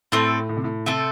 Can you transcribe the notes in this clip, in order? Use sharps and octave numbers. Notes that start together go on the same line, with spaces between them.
A2 A3 C4 A4
A2
C3
A2
C3 A3 C4 A4